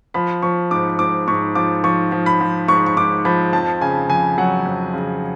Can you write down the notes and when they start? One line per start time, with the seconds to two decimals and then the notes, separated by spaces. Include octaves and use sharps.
0.14 F3 B5
0.42 F3 C#6
0.71 G#2 D6
0.99 G#2 D6
1.27 G#2 C#6
1.55 F3 D6
1.84 F3 C#6
2.12 F3
2.26 B5
2.41 F3
2.68 G#2 C#6
2.86 C#6
2.97 G#2 D6
3.25 F3 B5
3.53 F2 A5
3.81 C#3 G#5
4.10 F2 G#5
4.38 F#3 F#5
4.66 F2
4.94 C#3